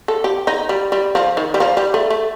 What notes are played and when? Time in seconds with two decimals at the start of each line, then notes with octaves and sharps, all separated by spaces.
0.08 A4
0.24 G4
0.47 D#4
0.69 G3
0.92 G3
1.15 F3
1.37 D#3
1.54 G3
1.60 F3
1.77 G3
1.94 A3
2.10 A3